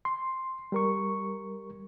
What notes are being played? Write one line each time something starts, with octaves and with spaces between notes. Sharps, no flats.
C6
G3 A#4 C#6